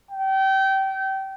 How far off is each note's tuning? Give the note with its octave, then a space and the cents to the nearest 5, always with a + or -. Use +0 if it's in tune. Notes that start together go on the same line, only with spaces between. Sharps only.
G5 -25